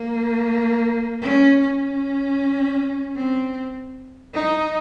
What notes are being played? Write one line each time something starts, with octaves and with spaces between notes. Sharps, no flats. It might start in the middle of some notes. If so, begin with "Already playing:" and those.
Already playing: A#3
C#4
C#4
C4
D#4